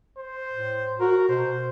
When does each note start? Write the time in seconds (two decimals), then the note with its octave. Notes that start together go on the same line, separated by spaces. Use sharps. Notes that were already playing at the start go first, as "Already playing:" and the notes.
0.17 C5
0.51 A2
1.00 F#4 A#4
1.29 B2 C5